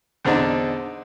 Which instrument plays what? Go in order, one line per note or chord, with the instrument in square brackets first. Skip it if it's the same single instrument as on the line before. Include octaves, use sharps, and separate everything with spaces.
[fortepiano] E2 D3 C4 D4 D#4